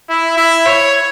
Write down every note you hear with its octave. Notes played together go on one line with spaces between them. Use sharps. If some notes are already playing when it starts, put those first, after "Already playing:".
E4
E4
C#5